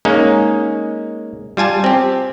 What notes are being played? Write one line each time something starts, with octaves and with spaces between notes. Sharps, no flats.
G#3 A#3 C#4 D#4
G3 F4 G#5 A5
C4 G4